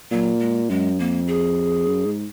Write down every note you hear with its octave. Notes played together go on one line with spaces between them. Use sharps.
A#2 F#3
G#3
F#2 G#3
F2 A#3
G#4
F#2
G#2